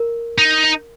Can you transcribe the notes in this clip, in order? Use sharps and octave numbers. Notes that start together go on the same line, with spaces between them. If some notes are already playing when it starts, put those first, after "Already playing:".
Already playing: A#4
D#4